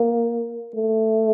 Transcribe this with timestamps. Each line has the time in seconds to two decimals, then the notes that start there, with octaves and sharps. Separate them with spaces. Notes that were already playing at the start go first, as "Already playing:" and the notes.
Already playing: A#3
0.76 A3